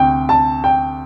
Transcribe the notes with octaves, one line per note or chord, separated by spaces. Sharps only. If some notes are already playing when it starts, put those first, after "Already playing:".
Already playing: D2 C3 G5
A5
G5